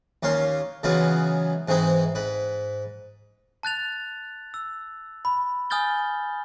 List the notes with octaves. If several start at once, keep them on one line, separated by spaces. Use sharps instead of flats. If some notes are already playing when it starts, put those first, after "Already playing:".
D#2 A#3 C#4 F5 C6
C#3 E3 F#3 G#3 B3 F4
G#2 E3 G#3 C4 D#4
G#2 B4
A5 F#6 A6 F7
E6
B5
G#5 D#6 F6 G6 A6 G7